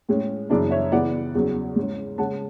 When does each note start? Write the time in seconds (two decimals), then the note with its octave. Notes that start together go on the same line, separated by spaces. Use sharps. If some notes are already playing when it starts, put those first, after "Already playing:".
0.09 A2 G#3 C#4
0.50 F#2 C#3 E3 B3 D4 D5
0.71 C#5 E5
0.92 C#3 E3 B3 D5 F#5
1.35 E2 C#3 F#3 C#4
1.76 G#2 G#3 C#4
2.18 C#3 G#3 C#4 F#5 A5